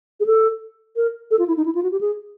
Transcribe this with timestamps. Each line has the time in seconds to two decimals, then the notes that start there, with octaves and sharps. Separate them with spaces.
0.20 G#4
0.26 A4
0.96 A#4
1.31 A4
1.39 F4
1.48 E4
1.57 D#4
1.65 E4
1.75 F4
1.83 F#4
1.92 G4
2.01 G#4